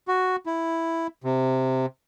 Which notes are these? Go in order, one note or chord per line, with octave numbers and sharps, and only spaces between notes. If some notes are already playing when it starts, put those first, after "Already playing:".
F#4
E4
C3